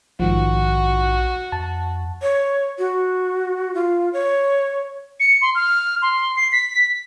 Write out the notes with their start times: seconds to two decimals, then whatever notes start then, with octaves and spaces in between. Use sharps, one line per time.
0.20 A#1 G#2 D#3 F3 F#4
1.52 F2 A5
2.22 C#5
2.79 F#4
3.75 F4
4.13 C#5
5.20 C#7
5.42 C6
5.55 F6
6.02 C6
6.36 C7
6.52 B6